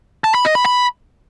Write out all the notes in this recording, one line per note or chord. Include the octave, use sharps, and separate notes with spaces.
A5
B5
D#5
B5
B5